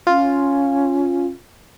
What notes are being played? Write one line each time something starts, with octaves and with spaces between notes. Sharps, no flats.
C#4 F4